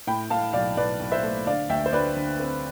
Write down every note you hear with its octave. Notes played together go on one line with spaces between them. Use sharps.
A2 G5 B5
A2 F5 A5
B1 D5 F5
B1 B4 D5
B1
C5 E5
A3
D3 D5 F5
D2 E5 G5
C5
D2 B4 D5
D3
C4